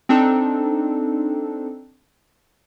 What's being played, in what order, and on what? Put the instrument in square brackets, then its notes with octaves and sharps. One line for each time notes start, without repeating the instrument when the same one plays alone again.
[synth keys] C4 D4 D#4 A4